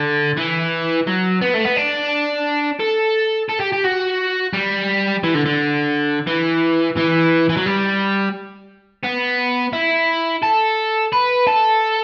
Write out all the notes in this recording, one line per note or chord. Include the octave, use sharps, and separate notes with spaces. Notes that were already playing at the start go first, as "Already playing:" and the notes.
Already playing: D3
E3
F#3
B3
A3
B3
D4
A4
A4
G4
G4
F#4
G3
E3
D3
D3
E3
E3
E3
F#3
G3
B3
E4
A4
B4
A4